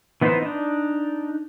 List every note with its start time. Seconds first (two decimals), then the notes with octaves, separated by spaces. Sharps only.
0.21 E3 B3 D#4 B4 C5
0.43 D4 D#4